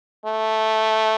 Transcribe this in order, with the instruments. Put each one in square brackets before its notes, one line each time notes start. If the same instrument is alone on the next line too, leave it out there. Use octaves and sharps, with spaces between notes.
[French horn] A3